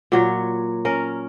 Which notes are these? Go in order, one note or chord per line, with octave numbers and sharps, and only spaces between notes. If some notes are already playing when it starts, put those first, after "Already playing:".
A#2 F#3 C#5
C#4 A#4